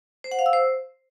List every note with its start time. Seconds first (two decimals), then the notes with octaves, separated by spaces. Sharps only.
0.24 C5
0.31 F#5
0.39 F5
0.46 E6
0.53 C5